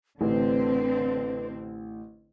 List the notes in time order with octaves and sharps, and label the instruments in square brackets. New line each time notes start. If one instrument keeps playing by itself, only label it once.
[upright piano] A1 [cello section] D3 C4 [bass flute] B4